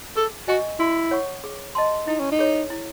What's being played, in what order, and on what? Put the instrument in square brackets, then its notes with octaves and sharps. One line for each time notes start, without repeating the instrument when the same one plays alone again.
[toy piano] G#4 [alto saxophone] A4
[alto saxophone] F#4 [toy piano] D#5 G#5 C#6
[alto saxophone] E4 [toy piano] F#4
[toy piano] C#5 F#5 C#6
G#4
D#5 A5 C6
[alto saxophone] D#4 [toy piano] E4
[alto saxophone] C#4
D#4
[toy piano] G#4 C#5
E4